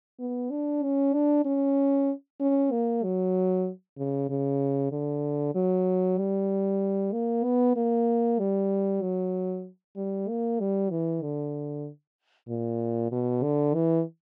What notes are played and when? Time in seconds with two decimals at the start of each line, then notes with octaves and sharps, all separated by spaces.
0.20 B3
0.51 D4
0.83 C#4
1.14 D4
1.45 C#4
2.41 C#4
2.72 A#3
3.04 F#3
3.98 C#3
4.30 C#3
4.92 D3
5.55 F#3
6.18 G3
7.13 A#3
7.44 B3
7.76 A#3
8.39 G3
9.02 F#3
9.97 G3
10.29 A#3
10.60 G3
10.91 E3
11.22 D3
12.49 A#2
13.12 B2
13.43 D3
13.74 E3